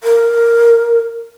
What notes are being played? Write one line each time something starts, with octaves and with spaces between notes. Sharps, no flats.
A#4